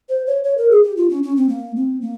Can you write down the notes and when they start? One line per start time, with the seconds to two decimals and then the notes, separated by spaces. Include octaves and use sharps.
0.09 C5
0.27 C#5
0.44 C#5
0.58 A#4
0.71 G#4
0.83 G4
0.97 F4
1.10 C#4
1.23 C#4
1.37 C4
1.49 A#3
1.76 C4
2.02 A#3